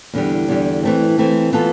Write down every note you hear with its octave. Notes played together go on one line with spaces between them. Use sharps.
E2 D3 G3
E2 D3 G3
E3 A3 C4
E3 A3 C4
E3 B3 F4 A4